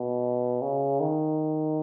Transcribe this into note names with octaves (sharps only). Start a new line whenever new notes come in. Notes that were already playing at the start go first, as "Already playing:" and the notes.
Already playing: B2
C#3
D#3